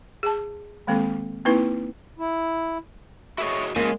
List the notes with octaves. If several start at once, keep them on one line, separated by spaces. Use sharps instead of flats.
G#4 A5
D#3 G#3 A#3 C4 A4
A#3 C4 D#4 E4 B4
E4
E4 F#4 G#4 C#5 D#5
C#3 F3 G#3 A#3 F4 G#5